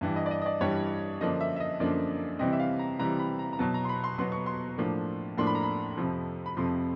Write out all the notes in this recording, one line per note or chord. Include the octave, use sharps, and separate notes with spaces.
G2 E3 G3
D#5
D5
D#5
D#5
D5
G2 E3 G3 C#5
F#2 D3 F3 A#3 D4 D#5
E5
E5
D#5
F#2 D3 F3 A#3 D4 D5
C3 E3 G3 C4 D#5
E5
F5
A#5
C3 E3 G3 C4 A#5
B5
A#5
A#5
B2 F#3 B3 A5
A#5
C6
B5
C6
B2 F#3 B3 C6
C#6
C6
A2 F3 A#3 D4
A2 F3 A#3 D4 C6
B5
A#5
B5
F2 C3 F3
B5
F2 C3 F3 C6